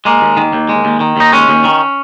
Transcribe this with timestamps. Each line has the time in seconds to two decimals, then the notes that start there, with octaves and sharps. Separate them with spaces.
0.05 G#3 A#3
0.21 D#2
0.37 D#3
0.53 D#2
0.69 G#3
0.85 D#2
1.00 D#3
1.17 D#2 D#4
1.32 G#3 C#4
1.49 D#2
1.64 D#3